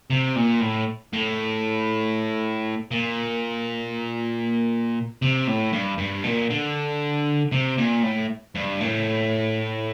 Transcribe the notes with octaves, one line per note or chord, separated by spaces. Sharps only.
C3
A#2
A2
A2
A#2
C3
A2
G2
G2
A#2
D3
C3
A#2
A2
G2
A2